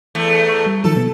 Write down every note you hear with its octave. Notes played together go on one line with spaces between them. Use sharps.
E2 A3
A#5 C#6
G3
D#3 F3 F#3 A4
B2 B3